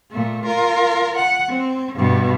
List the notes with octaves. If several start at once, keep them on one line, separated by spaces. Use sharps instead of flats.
A#2 A3
F4 A#4
F#5
C4
G2 B2